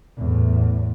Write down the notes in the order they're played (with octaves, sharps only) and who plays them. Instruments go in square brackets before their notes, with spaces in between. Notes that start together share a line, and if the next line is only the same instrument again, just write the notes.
[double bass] E2 A2